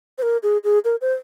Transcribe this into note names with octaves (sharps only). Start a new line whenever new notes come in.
C5
A#4
G#4
G#4
A#4
C5